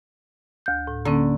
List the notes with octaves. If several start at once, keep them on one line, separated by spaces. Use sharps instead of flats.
D2 G6
A2
D3 A#3 C#4